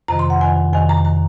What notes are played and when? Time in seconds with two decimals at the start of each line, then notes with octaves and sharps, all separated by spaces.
0.08 F2 C3 D#3 A#5
0.19 C6
0.30 F#5
0.41 F2 D#3 G#5
0.73 F2 C3 D#3 G#5
0.89 A#5
1.05 D#3 A#5